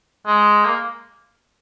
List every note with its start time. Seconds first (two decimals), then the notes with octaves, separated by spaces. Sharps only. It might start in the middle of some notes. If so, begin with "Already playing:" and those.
0.26 G#3
0.65 A#3